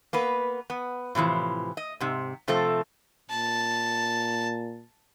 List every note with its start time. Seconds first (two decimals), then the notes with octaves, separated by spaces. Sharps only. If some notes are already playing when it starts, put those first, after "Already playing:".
0.13 A#3 B3 B4
0.70 B3
1.15 A2 C3 E3 F3
1.77 D#5
2.00 G#2 C3
2.48 C3 F3 A3 C4 A4
3.30 A#2 A5